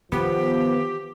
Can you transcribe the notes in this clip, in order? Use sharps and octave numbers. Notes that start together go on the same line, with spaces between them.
D#3 F3 B3 G4